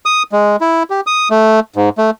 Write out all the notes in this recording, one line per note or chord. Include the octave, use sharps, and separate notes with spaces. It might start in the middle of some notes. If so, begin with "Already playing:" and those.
D#6
G#3
E4
G4
D#6
A3
G#2
A3